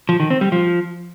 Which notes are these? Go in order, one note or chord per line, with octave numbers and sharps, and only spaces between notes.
F3
D#3
C4
G3
F3